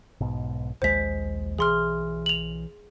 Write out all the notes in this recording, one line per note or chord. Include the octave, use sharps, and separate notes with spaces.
B1 G#2 B2
A#1 D#2 G#3 C5 B6
B1 E3 G#4 C6 F6
F7 F#7